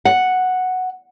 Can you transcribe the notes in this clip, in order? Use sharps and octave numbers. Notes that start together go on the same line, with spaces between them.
F#5